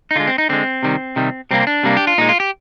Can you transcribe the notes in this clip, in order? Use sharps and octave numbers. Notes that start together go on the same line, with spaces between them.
D#4
D3 G#3 F4
C4
D#4
D3 G#3 C4
C3 D#3 G3
C3 D#3 G3
C3 G3 A#3 C4
D4
C3 G3 A#3
G4
F4
A#2 G#3 D#4
F4
G4